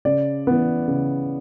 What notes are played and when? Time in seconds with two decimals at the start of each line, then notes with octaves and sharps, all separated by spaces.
0.05 C#3 D5
0.47 E3 B3
0.88 C#3